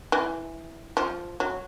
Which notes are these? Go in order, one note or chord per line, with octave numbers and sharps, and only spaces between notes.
E3
F3
F#3